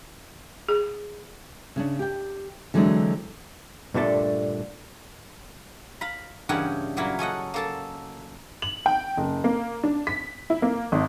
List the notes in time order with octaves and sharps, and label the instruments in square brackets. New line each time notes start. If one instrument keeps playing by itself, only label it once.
[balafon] G#4
[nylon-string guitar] C#3 C#4 D4
G4 G5
D3 E3 F#3 G#3 C4 D4
[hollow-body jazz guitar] G2 A#2 D3 A3 A5
[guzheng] F5 A#5 B5
G2 C#3 E3 G4 A#4 F#5
A#2 F#3 A#3 E4 F4
C#4 A4 D#5 F#5
A#3 A4 A5
[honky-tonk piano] F#7
G5
F#1
A#3
D4
B6
E4
A#3
G#1